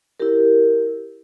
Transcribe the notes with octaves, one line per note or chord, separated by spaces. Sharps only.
E4 G4 A#4